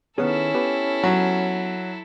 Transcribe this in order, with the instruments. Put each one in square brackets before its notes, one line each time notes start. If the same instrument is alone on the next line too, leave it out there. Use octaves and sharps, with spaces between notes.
[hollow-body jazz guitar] D#3 B3 G#4 [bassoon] C#4 [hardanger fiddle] E4 A4
[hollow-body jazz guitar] B3 G4 B4
[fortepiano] F#3